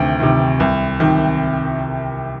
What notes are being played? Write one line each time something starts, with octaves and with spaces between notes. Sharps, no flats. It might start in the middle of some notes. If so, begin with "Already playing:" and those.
Already playing: D2 C3 D#3 G5
C3 D#3
C2
C3 D#3